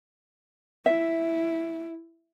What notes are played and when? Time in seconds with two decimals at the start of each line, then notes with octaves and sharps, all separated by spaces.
0.86 E4 E5